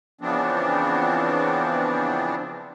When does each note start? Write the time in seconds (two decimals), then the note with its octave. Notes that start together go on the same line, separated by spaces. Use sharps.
0.21 C#3 E3 F3 B3 C4 D4